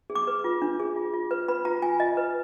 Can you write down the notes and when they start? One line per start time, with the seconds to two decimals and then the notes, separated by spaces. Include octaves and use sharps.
0.10 G#4
0.15 D6
0.27 B4
0.44 F4
0.62 D4
0.80 G#4
0.96 F4
1.14 F4
1.31 B4
1.48 B4 B5
1.65 F4 A#5
1.82 F4 G#5
2.00 F4 D#5
2.17 B4